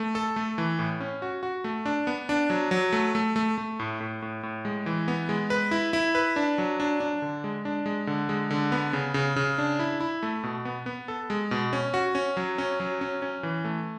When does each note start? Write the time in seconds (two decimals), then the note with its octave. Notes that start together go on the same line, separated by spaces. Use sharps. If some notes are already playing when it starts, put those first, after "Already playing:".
Already playing: A3
0.15 A4
0.36 A3
0.58 E3
0.79 A2
1.00 C#4
1.22 F#4
1.43 F#4
1.64 A3
1.86 D4
2.07 B3
2.29 D4
2.50 F#3
2.71 F#3
2.93 A3
3.15 A3
3.36 A3
3.58 A3
3.80 A2
4.01 A2
4.22 A2
4.43 A2
4.65 G#3
4.86 E3
5.08 B3
5.29 G#3
5.50 B4
5.71 E4
5.93 E4
6.15 B4
6.36 D4
6.58 F#3
6.80 D4
7.00 D4
7.22 D3
7.44 G#3
7.65 D4
7.86 G#3
8.07 D3
8.29 G#3
8.51 D3
8.72 B3
8.93 C#3
9.14 C#3
9.36 C#3
9.58 D4
9.79 E4
10.00 E4
10.23 A3
10.44 B2
10.65 B3
10.86 B3
11.08 A4
11.30 G#3
11.51 B2
11.73 C#4
11.94 F#4
12.15 C#4
12.37 F#3
12.58 C#4
12.80 F#3
13.01 C#4
13.22 C#4
13.43 E3
13.65 A3